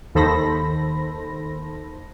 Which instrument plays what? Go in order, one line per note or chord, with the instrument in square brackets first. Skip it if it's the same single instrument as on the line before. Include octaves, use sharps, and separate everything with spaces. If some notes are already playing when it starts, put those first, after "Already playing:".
[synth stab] D#2 D#3 A4 C5 B5 A#6